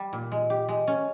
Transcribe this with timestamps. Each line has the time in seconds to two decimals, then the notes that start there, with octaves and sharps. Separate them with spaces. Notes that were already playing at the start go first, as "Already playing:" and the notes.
Already playing: G3
0.13 A#2
0.32 G#3
0.50 G4
0.69 G#3
0.87 C#4